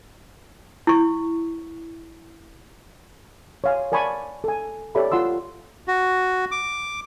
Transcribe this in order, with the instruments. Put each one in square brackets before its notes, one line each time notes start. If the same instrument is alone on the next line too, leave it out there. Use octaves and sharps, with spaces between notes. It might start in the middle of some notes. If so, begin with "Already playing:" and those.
[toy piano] E4 C#6
[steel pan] C#5 F5 G#5
A#4 D5 G#5 A5 B5 C#6
A4 G#5
G4 A4 C#5 D5 E5 B5
F4 F#5 C6 E6
[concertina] F#4
D6